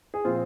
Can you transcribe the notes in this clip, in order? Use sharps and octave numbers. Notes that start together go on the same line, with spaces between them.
G#4
A#2 F3 C4 F4